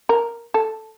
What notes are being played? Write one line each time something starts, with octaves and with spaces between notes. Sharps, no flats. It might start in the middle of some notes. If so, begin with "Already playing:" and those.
A#4
A4